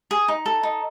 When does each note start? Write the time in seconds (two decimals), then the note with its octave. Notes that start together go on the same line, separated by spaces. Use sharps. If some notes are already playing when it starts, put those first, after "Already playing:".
0.11 G#4
0.28 D#4
0.46 A4
0.63 D#4